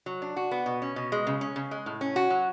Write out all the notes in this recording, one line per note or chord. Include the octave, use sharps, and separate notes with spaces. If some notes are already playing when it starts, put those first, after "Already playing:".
F#3
D4
F#4
B3
B2
C#4
B2
G#3
C#3
C#4
C#3
G#3
A2
C#4
F#4
F#3